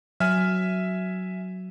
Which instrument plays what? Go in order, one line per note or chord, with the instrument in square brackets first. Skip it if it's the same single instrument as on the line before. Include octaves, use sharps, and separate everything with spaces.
[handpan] F#3 [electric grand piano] E5 G#5 [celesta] F6